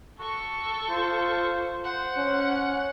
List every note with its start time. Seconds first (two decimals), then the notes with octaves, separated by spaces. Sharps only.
0.19 F#4 A4 C#6
0.89 F4 C5
1.84 C5 F#5
2.17 C#4